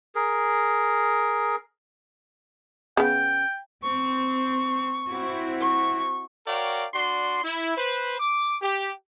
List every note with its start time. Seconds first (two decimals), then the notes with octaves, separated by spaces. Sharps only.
0.15 G#4 A#4
2.97 C#3 B3 G5
3.83 C4 C#6
5.12 C4 E4 F#4
5.61 C#6
6.47 F#4 A#4 C#5 D5 F5 G5
6.94 D4 F#4 D5 C6
7.44 E4
7.77 B4 C5
8.20 D6
8.62 G4